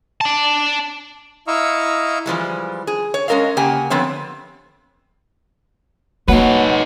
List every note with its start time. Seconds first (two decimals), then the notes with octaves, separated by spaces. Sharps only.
0.21 D5 A5
1.47 E4 D#5 F5 A#5 C#6 E6
2.26 E3 F3 G3 G#3
2.87 G#4
3.14 C#5
3.28 G#3 C#4 A#4 D#5 F5
3.57 C#3 A#3 G4 F#5 G#5
3.90 D3 F3 B3 C4 C#5
6.28 F#3 A#3 D#4 B4 F#5